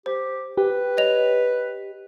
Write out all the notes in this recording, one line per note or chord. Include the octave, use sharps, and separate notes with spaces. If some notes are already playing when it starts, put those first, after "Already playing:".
G4 C5
G4 B4
C#5 D#5 F7